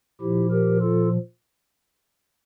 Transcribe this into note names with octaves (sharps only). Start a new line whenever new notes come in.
A#2 F3 E4 G4
G4 A#4
F4 A4